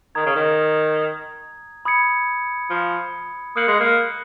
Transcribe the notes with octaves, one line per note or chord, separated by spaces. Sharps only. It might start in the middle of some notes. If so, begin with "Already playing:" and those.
D#3 A#5 D#6 G#6
C#3
D#3
B5 D#6 G#6 C#7
F3
A#3 D#6 F#6 C#7 F#7
G#3
A#3